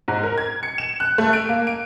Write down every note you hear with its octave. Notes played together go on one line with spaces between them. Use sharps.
G#2
A#4
G#6
C#7
E7
F#6
A3
D7
A#3
D7